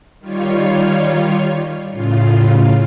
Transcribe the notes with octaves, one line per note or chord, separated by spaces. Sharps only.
D#3 G3 F4 C#5
A2 C#3 F4